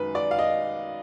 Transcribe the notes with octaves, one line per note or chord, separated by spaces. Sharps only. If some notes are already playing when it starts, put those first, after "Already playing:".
Already playing: F#2 D#3 G#3 B4
D5
F5
D#5